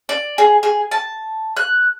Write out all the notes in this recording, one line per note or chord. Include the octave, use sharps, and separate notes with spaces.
D5
G#4
G#4
A5
F#6